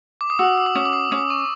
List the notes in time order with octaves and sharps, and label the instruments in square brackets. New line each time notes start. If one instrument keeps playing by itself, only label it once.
[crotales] D6
D#6
[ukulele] F#4 [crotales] E6
[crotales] E6
D6
[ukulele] C#4 [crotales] D#6
[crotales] D6
D#6
[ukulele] C#4 [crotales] D#6
[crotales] C#6